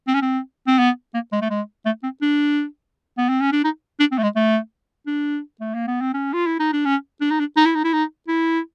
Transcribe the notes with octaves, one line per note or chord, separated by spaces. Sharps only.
C4
C#4
C4
C4
B3
A#3
G#3
A3
G#3
A3
C4
D4
B3
C4
C#4
D4
D#4
D4
C4
A3
G#3
A3
D4
A3
A#3
B3
C4
C#4
F4
E4
D#4
D4
C#4
D4
D#4
D4
D#4
E4
D#4
E4
D#4
E4